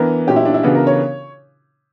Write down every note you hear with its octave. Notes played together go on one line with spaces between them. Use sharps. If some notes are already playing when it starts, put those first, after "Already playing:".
Already playing: E3 B3 D4 A#4
A#2 F#3 C#4 G4
E4
D4
E4
C#3 E3 B3 D4 F#4
A#4
C#5